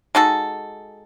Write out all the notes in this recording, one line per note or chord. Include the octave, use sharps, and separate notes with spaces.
G#3 D#4 F#4 A4